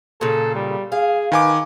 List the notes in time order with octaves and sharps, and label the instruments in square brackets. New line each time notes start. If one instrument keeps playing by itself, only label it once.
[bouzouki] A#2 C#3 [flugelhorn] A4
[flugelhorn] G3
[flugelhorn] G#4 [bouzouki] F5
[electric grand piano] D#3 G#5 D6 [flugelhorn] B4